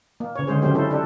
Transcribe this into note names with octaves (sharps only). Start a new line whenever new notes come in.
A#3
C#3 C#5
D3 G#3 C#4 G#4 C5
C#3 F#3 C4 C#4 G4 C5
C#3 C#4 E4 A4 C5
D4 G4 A4